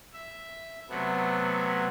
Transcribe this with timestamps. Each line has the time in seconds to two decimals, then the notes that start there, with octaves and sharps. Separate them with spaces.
0.13 E5
0.89 C3 F#3 A3 B3